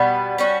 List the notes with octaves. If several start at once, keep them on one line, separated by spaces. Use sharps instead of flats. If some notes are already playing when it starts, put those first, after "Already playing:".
Already playing: B2 G3 B3
G3 C#4 F#4